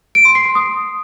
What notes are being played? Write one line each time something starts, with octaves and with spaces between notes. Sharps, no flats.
D7
C6
C7
C6
D#6